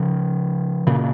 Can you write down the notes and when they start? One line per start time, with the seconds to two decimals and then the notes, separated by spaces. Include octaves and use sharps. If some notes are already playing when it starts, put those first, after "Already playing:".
Already playing: C#3 F3
0.87 A#2 C#3